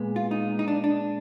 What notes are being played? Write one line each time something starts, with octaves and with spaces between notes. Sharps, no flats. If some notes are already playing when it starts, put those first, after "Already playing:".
Already playing: A#2 G#3 B3
F4
D#4
D#4
D4
D4